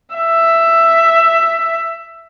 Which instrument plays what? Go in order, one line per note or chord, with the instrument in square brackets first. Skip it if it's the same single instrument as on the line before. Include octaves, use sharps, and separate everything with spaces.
[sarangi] E5